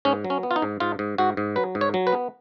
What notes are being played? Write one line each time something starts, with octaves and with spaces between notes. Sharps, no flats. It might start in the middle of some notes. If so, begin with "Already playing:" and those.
G#2 C#4
F#3
C#4
B3
F4
D#4
G#2
G#2 F4
G#2
G#2 F#4
G#2
F#3 B4
G#2
C#5
F#3
B4
B3